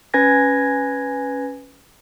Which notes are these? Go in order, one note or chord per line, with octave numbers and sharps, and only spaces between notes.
C#4 B4 G#5 G#6 A#6